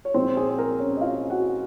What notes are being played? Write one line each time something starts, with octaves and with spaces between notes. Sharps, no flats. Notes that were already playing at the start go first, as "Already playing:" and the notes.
C#5
A#2 F3 G#3 C4 D#4 C5
G#4
C5
A#4
C#4 C#5
D#5
F4 F5
F#4 F#5